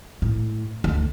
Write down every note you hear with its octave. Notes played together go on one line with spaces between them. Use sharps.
A2
D2